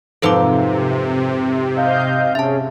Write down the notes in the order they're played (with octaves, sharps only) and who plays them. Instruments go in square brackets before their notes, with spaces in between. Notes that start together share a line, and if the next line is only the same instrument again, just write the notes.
[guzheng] F2 G#2 F#3 [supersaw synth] C3 [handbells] A4 B4 D6
[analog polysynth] D#5 F5 G6
[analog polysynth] C#4 G#4 [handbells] E5 A5